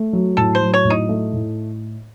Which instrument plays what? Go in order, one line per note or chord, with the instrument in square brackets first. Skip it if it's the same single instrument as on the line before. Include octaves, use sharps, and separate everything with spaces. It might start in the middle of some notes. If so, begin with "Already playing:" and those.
Already playing: [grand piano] A3
F#3
[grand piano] A2 [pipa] A4
[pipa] C5
[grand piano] F#3
[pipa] C#5
[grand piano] A2
[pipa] D#4
[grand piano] A3
A2